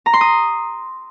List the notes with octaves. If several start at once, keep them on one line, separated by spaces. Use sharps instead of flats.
A#5
C6
D#6